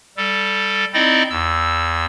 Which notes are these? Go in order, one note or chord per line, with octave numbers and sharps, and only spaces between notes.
G3 A4
C4 D#4 E4 D5 D#5
E2 E6